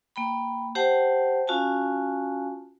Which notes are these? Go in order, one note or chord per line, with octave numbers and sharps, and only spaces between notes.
A#3 G5 B5
G4 C5 F#5 G5 A5
C#4 F4 F#4 F5 G#5 A5